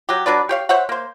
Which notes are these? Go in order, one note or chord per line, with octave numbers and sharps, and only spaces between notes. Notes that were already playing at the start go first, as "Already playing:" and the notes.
F#3 G4
F#3 D4 B4 D5
G4 C#5 F5
C5 C#5 E5 F#5
A#3 C5